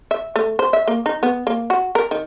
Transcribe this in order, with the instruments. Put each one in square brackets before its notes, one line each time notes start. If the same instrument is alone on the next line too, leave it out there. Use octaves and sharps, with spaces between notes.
[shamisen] E5
A3
C5
E5
A#3
D#4
B3
A#3
F#4
A#4
D#3